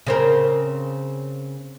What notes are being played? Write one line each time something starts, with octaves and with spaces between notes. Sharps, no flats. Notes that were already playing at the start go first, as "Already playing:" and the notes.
C#3 C4 A#4